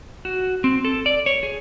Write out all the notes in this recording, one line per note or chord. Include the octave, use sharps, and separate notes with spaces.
F#4
C4
A4
D5
C#5
G#4